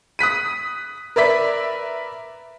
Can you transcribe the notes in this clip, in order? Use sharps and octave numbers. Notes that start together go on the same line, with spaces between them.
D#6 F#6 B6 D#7
A#4 B4 D5 E5 B6